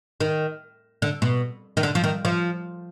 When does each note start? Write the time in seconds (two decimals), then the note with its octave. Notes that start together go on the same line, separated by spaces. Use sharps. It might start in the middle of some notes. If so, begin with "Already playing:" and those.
0.21 D#3
1.02 D3
1.22 B2
1.77 D#3
1.83 D3
1.95 F3
2.04 D#3
2.25 F3